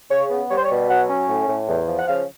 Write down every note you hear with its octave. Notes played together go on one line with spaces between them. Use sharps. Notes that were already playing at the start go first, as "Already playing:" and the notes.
C#3 C#5
B3
G3 C#5
C5
C#5
B2
F#3 F#5
C#4
A2
A2
E2
F3
F#5
C#3 F5